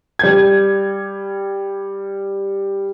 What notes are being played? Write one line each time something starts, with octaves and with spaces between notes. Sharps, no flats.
G3 G6 G#6